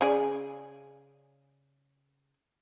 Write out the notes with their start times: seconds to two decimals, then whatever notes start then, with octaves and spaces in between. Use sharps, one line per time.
0.01 C#3 G#4 D5